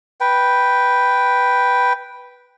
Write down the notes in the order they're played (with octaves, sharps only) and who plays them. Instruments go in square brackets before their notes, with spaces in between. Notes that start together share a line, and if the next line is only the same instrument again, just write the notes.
[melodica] B4 G5